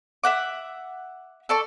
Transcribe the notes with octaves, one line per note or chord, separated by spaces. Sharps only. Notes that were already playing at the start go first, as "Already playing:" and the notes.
E5 F#5 D6
A4 D5 C#6